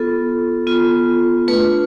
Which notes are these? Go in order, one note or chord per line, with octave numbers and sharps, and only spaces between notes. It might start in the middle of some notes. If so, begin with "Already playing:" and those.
Already playing: B3 F4 A4
B3 F4
A3 D4 F4 B4